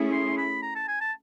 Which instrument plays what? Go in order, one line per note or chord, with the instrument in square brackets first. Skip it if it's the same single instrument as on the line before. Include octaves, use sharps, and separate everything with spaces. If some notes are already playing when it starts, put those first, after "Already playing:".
Already playing: [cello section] A3 C#4 E4 G#4
[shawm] C6
B5
A#5
A5
G#5
A5